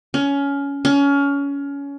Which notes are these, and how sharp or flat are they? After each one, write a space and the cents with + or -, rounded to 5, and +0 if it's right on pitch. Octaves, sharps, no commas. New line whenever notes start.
C#4 +20
C#4 +25